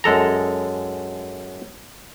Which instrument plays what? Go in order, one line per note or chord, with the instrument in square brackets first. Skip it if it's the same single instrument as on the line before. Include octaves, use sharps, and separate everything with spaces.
[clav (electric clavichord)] F#2 G#3 A4 A#5